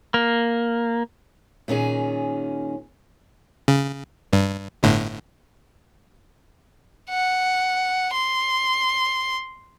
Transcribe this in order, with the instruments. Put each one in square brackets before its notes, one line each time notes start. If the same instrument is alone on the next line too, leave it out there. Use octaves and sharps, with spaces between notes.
[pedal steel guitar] A#3
[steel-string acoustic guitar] A#2 D#3 C#4 G#4
[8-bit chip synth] C#3
G2
G1 A2 D3
[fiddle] F#5
C6